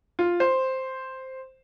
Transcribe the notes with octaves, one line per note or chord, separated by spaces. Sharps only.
F4
C5